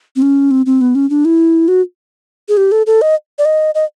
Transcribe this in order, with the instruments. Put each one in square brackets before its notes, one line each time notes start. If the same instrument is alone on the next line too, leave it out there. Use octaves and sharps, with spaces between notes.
[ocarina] C4
C#4
C4
C4
B3
C#4
D4
E4
F#4
G#4
G4
A4
A4
D#5
D5
D#5
D#5